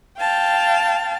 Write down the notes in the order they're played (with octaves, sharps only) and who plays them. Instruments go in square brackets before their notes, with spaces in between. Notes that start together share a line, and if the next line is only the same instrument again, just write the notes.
[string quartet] F5 G5 A5